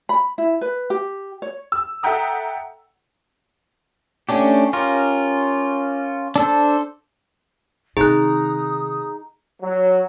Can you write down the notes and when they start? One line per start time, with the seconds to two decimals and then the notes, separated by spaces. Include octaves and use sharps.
0.09 B5
0.38 E4
0.61 B4
0.90 G4
1.42 C#5
1.72 E6
2.03 A4 E5 F#5 G5 A#5 D#6
4.29 A3 C#4 D4 G4
4.73 C#4 F4 G4 A#4
6.36 D4 A4 C5
7.97 C3 D#3 D#4 G#4 A#5 D#6 F#6
9.62 F#3